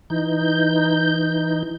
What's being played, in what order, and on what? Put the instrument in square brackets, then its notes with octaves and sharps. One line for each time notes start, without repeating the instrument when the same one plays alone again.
[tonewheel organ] E3 D#4 G6